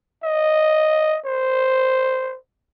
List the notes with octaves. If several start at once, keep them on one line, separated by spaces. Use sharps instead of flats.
D#5
C5